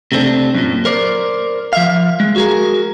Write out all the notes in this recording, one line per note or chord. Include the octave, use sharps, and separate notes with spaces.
C3 A3 C4 D4
F#2 A#2
A#4 C5 D5
F3 E5 F5
G#3
F#4 G#4 A#4